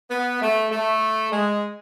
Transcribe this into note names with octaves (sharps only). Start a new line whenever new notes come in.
B3
A3
A3
G#3